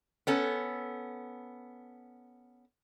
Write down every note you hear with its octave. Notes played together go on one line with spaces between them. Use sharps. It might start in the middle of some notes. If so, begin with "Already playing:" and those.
B3 C#4 A4